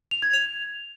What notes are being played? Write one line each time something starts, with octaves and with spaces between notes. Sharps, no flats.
F7
G#6
F7